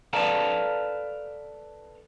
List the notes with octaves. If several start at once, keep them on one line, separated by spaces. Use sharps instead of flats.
A4 B4 D5 F5 A5 A#5